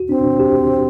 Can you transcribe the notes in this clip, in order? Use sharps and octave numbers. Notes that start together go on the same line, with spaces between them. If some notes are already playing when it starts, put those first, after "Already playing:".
Already playing: F#4
C4 D4
D4
G4